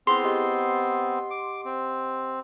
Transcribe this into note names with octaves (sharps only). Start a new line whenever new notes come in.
B3 C4 E4 G#4 C6
G4 D#5 F#5
D6
C4